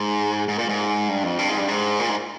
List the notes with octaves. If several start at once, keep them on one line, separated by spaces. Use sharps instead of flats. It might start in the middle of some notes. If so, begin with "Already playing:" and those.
Already playing: G#2
G#2
A#2
G#2
G2
F2
G2
G#2
G2
G#2
A#2
G#2